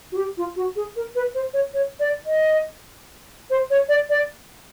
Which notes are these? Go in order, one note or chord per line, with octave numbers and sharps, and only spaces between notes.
F#4
G4
F4
F#4
G#4
A#4
B4
C5
C#5
C#5
D5
D#5
C5
C#5
D5
D5